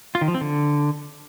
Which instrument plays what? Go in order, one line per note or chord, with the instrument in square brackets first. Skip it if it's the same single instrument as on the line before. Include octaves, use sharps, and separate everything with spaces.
[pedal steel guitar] F4
D#3
F3
C4
D3